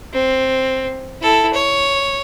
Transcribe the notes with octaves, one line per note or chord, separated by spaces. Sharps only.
C4
E4 A4
C#5